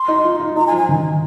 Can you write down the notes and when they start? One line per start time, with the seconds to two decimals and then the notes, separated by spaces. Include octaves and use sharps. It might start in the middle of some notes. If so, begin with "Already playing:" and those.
Already playing: C6
0.08 D#4
0.24 F4
0.40 F4
0.56 D#4 A#5
0.67 G#5
0.72 F3
0.77 G#5
0.89 D#3